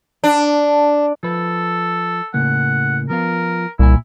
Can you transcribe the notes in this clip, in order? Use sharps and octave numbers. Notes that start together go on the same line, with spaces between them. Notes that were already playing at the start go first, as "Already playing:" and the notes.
D4
F3 A4 B4
A2 C#3 A#3 F#5
F3 B3 F4 A#4
C2 A#2 E4 G#5